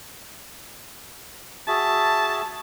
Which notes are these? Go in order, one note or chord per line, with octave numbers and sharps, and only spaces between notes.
F#4 G#4 E5 A5